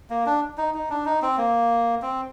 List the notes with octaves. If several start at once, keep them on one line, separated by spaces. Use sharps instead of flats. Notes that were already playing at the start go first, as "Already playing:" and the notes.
A#3
D4
D#4
D#4
D4
D#4
C4
A#3
C4